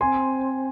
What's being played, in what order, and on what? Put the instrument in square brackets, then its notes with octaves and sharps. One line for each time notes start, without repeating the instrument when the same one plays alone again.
[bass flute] C4 [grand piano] G#5 C6